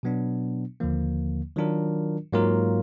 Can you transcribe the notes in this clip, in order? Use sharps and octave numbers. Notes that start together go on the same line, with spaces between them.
B2 F#3 B3 D4
D#2 D3 F3 A#3
D#3 F#3 D4 F4 A#4
G#2 F#3 A#3 F4 A#4